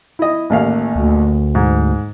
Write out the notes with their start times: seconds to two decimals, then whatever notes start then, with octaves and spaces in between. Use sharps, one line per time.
0.19 E4 D#5
0.50 A1 D#2 F5
0.96 D2
1.55 G#2